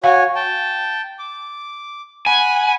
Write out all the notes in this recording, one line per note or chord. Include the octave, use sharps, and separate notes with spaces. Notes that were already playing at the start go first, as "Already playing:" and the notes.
F#4 C#5 F5 G#5
G5 A5
D6
F#5 G#5 B5